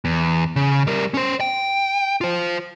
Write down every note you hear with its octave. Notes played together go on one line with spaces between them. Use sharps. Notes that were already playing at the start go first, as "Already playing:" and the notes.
E2
C#3
G3 A#4
C#4 C5
G5
F4 C5